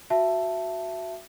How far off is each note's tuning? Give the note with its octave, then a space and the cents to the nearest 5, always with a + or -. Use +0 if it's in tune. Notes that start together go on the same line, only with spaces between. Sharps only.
F#4 +0 E5 +20 A5 +0